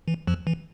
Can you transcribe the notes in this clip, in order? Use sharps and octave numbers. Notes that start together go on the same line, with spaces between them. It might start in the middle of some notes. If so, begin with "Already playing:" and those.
E3
F2 F3
E3